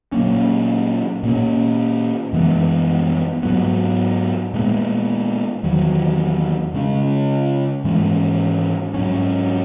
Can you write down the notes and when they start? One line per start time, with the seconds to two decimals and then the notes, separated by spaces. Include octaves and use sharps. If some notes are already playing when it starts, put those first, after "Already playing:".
0.13 A#2 F#3 A#3 C#4
1.23 A#2 A#3 C#4
2.33 F#2 E3 G#3 B3
3.43 G#2 F#3 B3
4.53 A#2 G#3 B3
5.63 E2 D#3 F#3
6.74 C#3 G#3 C#4
7.84 G#2 E3 G#3 C#4
8.94 G#2 F#3 C#4